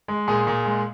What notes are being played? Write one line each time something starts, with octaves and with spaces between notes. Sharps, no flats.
G#3
A#2 G#4
A#2
G#3